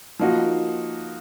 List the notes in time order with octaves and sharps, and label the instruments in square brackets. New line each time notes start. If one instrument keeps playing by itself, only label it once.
[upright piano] F3 A#3 D#4 F#4